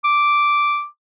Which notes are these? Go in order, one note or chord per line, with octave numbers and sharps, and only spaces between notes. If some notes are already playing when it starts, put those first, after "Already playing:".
D6